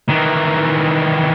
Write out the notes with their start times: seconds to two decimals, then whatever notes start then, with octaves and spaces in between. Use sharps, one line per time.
0.09 D#3 E3